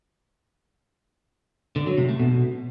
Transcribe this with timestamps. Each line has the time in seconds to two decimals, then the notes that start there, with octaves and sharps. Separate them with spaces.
1.76 D3
1.87 F#3
1.98 C3
2.09 A3
2.19 B2